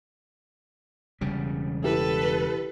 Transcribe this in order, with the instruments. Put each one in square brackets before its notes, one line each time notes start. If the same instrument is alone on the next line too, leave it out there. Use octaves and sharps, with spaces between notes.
[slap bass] E1 C#3 G3
[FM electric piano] E4 G4 [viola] A4 B4